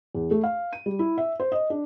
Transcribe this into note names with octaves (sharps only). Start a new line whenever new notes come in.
E2
A3
F5
D#7
G3
E4
E5
C5
D#5
D4